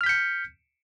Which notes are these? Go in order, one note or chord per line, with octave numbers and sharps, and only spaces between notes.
F6 G6 B6 C#7